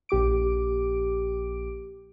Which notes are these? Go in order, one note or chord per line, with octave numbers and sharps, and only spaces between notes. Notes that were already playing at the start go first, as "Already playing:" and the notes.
A#1 G4 D6 D7